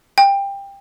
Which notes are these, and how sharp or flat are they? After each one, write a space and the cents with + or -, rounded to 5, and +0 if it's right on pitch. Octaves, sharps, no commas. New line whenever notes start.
G5 +20